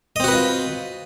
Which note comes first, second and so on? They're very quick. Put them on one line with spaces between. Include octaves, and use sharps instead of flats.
D#5 C4 F#4 B4 F4